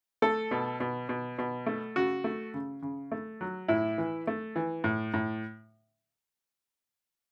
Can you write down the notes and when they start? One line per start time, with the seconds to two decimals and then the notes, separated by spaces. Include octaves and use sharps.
0.22 A3 A4
0.51 B2
0.80 B2
1.09 B2
1.38 B2
1.67 A3
1.96 C#3 F#4
2.24 A3
2.54 C#3
2.82 C#3
3.12 A3
3.41 F#3
3.68 A2 E4
3.98 E3
4.27 A3
4.56 E3
4.84 A2
5.14 A2